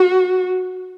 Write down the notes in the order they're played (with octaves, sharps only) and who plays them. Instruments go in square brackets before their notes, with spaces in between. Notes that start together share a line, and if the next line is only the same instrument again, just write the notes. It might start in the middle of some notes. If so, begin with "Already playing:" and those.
Already playing: [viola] F#4